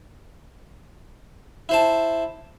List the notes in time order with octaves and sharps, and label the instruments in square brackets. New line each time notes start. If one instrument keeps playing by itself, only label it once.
[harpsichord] E4 C5 A5